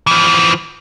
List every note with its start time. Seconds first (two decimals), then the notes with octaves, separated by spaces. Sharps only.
0.07 E3 F3